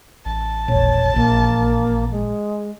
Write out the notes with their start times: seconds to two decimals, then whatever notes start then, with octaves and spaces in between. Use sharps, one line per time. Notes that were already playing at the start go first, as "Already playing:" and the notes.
0.25 A1 A5
0.68 E1 A#1 C#5
1.16 A#1 A#3
2.12 G#3